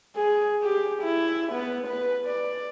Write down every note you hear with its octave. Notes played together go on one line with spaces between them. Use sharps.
G#4
G4
E4
B3
B4
D5